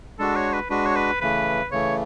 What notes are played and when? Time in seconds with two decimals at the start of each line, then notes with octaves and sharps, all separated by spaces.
0.19 G#3 D4 F#4 A4
0.36 C#5
0.53 B4
0.70 G#3 D4 F#4 B4
0.86 C#5
0.96 B4
1.21 C#3 E3 A3 B4
1.72 C#3 E3 A3 C#5